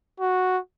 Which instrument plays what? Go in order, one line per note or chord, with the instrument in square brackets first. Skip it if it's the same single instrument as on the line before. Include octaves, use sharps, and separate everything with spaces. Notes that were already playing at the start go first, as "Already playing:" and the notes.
[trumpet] F#4